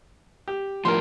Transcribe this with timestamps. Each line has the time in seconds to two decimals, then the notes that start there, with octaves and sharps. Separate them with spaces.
0.48 G4
0.85 A2 F3 A#4 C6